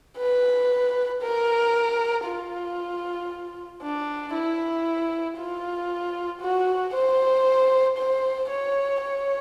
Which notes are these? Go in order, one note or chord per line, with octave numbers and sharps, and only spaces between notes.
B4
A#4
F4
D4
E4
F4
F#4
C5
C5
C#5
C#5